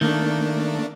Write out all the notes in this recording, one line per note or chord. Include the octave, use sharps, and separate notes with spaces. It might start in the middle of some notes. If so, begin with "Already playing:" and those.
D#3 A3 A#3 D4